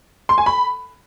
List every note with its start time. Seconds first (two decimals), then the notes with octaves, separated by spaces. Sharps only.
0.29 C6
0.38 G#5
0.46 B5